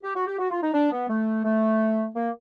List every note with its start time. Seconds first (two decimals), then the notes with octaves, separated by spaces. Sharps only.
0.03 G4
0.15 F#4
0.27 G4
0.38 F#4
0.50 F4
0.62 D#4
0.73 D4
0.92 B3
1.09 A3
1.44 A3
2.15 A#3